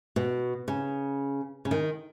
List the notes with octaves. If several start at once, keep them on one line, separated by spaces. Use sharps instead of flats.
B2
C#3
C#3
D#3